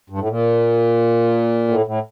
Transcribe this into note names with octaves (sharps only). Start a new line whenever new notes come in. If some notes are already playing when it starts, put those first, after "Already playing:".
G2
A2
A#2
A2
A2